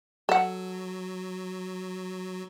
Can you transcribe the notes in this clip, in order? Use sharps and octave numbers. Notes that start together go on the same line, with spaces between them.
F#3 A4 F#5